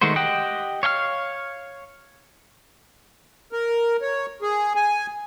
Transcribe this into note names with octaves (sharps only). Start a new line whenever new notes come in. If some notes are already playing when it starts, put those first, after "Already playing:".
D#3 G#3 A3 F#4 C5
G4 D#5 F#5 G5
C#5 F5 G5 F6
A#4
C#5
G#4
G#5